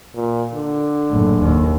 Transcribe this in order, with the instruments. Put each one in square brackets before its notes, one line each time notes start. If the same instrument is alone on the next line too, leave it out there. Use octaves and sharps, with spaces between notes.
[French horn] A#2
D3
[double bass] F#1 A2
D#2